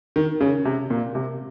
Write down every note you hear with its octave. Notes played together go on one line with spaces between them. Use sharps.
D#3
C#3
C3
A#2
C3